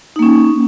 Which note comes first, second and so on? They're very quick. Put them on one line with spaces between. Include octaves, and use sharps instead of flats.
D#4 A#3 C#4